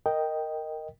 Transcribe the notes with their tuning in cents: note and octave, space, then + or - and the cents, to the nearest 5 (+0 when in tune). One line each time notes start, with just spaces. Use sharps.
A#4 -10 D#5 +0 G5 +0